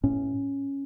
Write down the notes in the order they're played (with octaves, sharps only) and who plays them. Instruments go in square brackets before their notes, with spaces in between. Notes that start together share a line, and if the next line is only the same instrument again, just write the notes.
[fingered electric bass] A2 C#4